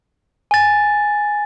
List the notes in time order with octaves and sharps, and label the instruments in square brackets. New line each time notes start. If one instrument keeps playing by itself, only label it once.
[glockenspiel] G#5 A6